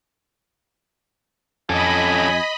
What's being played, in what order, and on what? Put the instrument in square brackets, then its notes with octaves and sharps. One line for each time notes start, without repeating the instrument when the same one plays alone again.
[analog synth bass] F2 [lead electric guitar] C#4 A4 [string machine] D#5 B5 [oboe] G#5